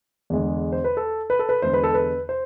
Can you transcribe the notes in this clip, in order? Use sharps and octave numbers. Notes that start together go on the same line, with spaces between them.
E2 D3 G#3
C5
B4
A4
B4
A4
B4
E2 D3 G#3 C5
B4
A4
B4
C5